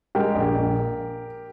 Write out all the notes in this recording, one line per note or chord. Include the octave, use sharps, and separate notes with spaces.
G#3 G4 A#4
A#1
A#1